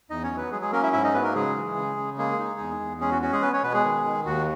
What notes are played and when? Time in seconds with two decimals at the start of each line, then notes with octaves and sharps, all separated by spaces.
0.10 E2 D#4 D#5
0.23 C#4 C#5
0.31 F#3
0.37 B3 B4
0.52 F#3 G#3 G#4
0.62 G#3 G#4
0.72 A#3 C#4 A#4
0.83 E4 E5
0.93 G#2 E4 E5
1.03 D#4 D#5
1.13 F#3 B3 B4
1.24 A#3 A#4
1.35 C#3 G#3 G#4
1.56 E3
1.76 C#3
1.97 C#3
2.18 G#3 A#3 G#4
2.39 D#4
2.59 E2
2.80 E2
3.01 G#3 C#4 G#4
3.11 F#4
3.22 C#4 F#4
3.33 G#3 G#4
3.42 B3 B4
3.53 C#4 C#5
3.63 B2 B3 B4
3.74 G#3 G#4
3.84 D#3
4.05 D#3
4.26 D#2 F#4